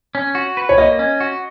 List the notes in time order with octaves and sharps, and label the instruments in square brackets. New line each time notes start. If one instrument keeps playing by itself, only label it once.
[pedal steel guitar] C#4
F#4
B4
[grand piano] C#5
[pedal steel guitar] A#3 [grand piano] D#5
[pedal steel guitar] C#4
F#4